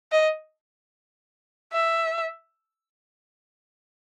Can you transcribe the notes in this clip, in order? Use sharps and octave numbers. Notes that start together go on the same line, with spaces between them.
D#5
E5